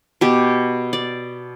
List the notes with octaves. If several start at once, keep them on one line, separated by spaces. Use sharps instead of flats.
B2 G4
D5